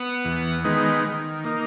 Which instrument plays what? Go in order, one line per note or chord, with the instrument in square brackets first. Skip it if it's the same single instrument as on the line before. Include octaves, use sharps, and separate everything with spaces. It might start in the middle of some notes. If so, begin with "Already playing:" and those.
Already playing: [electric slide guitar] B3
[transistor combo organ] E2
D#3 G#3 B3 D#4
D#3
A#3 D#4